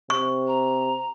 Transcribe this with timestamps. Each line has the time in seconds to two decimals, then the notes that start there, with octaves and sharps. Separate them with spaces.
0.10 C3 C#6
0.47 A#5